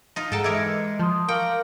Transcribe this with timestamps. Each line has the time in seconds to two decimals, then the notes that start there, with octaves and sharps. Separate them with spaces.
0.16 D#4 F4
0.32 G#2 G#4 A4 F#5 G5 A5 A#5 A6
0.44 E3 G#3 A#4 D#5 E5 D6 G#6 C#7
0.99 F3 A5 C6 D#6
1.28 A#4 F5 G5 C#6 D6 F#7